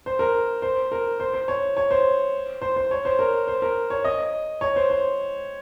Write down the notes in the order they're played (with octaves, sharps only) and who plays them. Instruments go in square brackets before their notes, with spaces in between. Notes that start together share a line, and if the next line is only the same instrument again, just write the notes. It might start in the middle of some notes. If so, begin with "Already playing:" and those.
[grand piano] C5
A#4
C5
A#4
C5
C5
C#5
C#5
C5
C5
C5
C#5
C5
A#4
C5
A#4
C#5
D#5
C#5
C5
C5